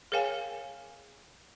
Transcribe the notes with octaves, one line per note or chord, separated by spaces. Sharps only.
G#4 A#4 C#5 F5 G5 G#5